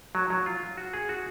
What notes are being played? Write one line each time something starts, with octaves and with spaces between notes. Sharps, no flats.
F#3
F#3
F4
F#4
G#4
F#4